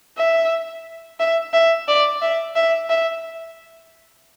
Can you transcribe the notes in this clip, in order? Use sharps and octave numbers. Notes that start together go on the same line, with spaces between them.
E5
E5
E5
D5
E5
E5
E5